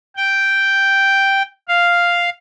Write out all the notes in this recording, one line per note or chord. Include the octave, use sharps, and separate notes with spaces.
G5
F5